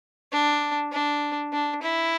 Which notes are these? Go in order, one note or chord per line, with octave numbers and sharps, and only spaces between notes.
D4
D4
D4
E4